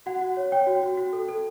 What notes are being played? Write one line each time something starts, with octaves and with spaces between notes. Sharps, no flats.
F#4 F#5
F#4
C#5
C#5 G5
F#4
F#4
F#4
A4
A4